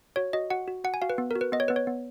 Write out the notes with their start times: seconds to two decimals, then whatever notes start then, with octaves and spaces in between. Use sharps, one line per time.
0.16 F#4 C#5
0.33 F#4 D#5
0.50 F#4 F#5
0.68 F#4
0.84 F#4 F#5
0.94 G#5
1.02 F#4 F5
1.10 B4
1.18 B3
1.31 F#4 A#4
1.41 B4
1.52 B3 D#5
1.60 C#5
1.68 B3 B4
1.76 C#5
1.87 B3